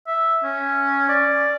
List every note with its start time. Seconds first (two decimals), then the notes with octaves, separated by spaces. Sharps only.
0.07 E5
0.44 C#4
1.09 D5